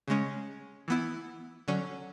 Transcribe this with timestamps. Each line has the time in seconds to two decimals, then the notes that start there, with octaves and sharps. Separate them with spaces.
0.08 C#3 G#3 C#4
0.88 E3 B3 E4
1.68 D3 F#3 C#4